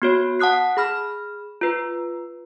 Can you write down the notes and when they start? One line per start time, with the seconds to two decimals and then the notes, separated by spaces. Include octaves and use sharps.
0.02 B3 F#4 C#5
0.39 F#5 A5 D#6 F#6 C7
0.77 G#4 B5 F6
1.61 F4 B4